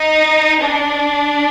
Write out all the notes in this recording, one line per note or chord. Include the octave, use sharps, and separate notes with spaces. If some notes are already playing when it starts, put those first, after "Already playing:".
Already playing: D#4
D4